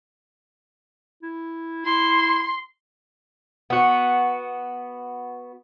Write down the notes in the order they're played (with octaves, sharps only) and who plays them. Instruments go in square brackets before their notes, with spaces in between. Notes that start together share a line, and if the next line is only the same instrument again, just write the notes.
[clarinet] E4
[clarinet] E4 [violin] C6
[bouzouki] B3 F#4